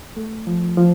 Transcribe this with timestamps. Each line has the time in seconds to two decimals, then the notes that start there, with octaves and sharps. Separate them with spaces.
0.17 A3
0.47 F3
0.77 F3